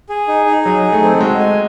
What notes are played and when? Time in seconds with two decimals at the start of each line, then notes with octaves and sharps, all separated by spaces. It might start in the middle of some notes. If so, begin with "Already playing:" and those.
0.09 G#4
0.28 D#4
0.46 D#4
0.65 F#3 G#4
0.83 D#4
0.92 A3
1.02 C4
1.14 A3
1.21 G#3 F#4
1.39 G#5